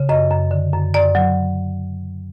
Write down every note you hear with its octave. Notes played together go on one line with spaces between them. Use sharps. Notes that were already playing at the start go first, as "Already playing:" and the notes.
Already playing: C#3
F#2 D#5
F#2
D3
F#2
F#2 D5
F#3